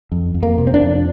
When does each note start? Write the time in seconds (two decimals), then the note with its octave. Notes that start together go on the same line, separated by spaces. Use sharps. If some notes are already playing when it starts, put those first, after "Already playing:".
0.12 F2
0.35 F2
0.43 A#3
0.58 C3
0.67 C4
0.74 D4
0.82 F2